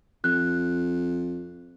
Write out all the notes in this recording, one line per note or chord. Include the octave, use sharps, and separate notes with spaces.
F2 F#6